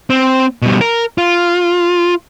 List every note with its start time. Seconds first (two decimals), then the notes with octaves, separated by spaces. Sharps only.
0.10 C4
0.62 B2 G3
0.81 A#4
1.18 F4